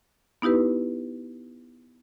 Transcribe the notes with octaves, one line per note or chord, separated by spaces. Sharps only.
B3 D#4 E4 G4 B4